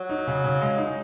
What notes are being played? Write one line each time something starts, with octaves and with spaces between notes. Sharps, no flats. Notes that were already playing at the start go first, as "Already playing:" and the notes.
Already playing: F#3
D#4
C#3
C#3
G#3
D#4